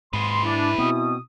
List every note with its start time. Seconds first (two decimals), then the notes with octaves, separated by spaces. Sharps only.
0.13 G#2 G#4 B4 C6
0.45 D4 E4
0.78 B2 B3 C4 D#6